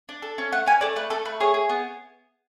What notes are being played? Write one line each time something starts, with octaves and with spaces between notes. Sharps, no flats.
D4
A4
C#4
A3 F#5
C#4 G#5
A3 D5
A3 B4
A3 A4
A3 B4
G#4 C#5
G#4
B3